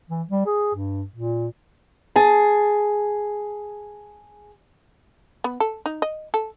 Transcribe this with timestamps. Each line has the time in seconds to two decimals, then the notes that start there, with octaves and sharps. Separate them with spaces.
0.09 E3
0.29 G3
0.46 G#4
0.75 G2
1.16 A#2
2.16 G#4 A5
5.44 B3
5.60 A4
5.86 D#4
6.02 D#5
6.34 A4